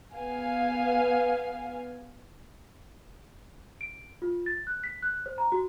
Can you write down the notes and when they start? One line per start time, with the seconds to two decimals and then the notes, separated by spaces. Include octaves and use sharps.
0.13 B3 F5 G#5
3.81 D7
4.22 F4
4.46 A6
4.67 F#6
4.84 B6
5.03 F#6
5.26 C5
5.38 A#5
5.52 F#4